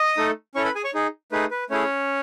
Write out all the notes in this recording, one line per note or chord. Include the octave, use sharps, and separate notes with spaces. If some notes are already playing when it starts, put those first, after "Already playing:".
Already playing: D#5 D#6
A3 D#4 A4
C#4 E4 A4 C#5 C#6
B4 B5
G#4 G#5
C#5 C#6
D#4 G#4
A3 D#4 G#4 B4
B4
A3 C#4 E4 G#4 C#5